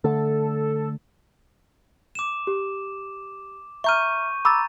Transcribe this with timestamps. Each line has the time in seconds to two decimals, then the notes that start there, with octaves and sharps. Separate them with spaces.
0.04 D3 A3 A4
2.15 D6 E7
2.47 G4
3.84 E5 A#5 C#6 F6 G6 D#7
4.45 A#5 B5 D6 E6 A6